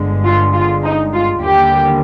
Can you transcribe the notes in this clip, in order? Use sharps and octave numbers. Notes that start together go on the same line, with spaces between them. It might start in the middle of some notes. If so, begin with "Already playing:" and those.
Already playing: G1 G2 D3 G#3
F4
F4
D#4
F4
D#2 D3 G3 A#3 G4